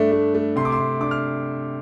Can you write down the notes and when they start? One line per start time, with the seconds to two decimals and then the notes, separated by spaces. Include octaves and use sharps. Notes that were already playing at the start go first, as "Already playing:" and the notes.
Already playing: G2 A3 D4
0.12 A3
0.34 A3
0.56 C3 C6
0.65 D6
0.72 C6
0.79 C3
1.01 D4 D6
1.11 F6